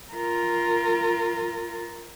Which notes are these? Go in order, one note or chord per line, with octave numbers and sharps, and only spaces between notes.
F4 A#4